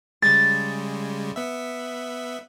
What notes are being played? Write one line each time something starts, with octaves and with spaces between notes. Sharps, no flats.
C#3 G3 G#3 A6
B3 E5